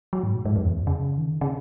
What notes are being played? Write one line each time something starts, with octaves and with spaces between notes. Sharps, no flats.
F#3
G#2
A#2
G#2
F#2
E2
F#2
C#3
D#3
C#3